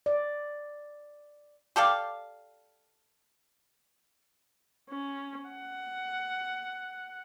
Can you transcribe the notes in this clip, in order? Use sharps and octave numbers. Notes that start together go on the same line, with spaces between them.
D5
G4 A4 D5 F5
C#4
F#5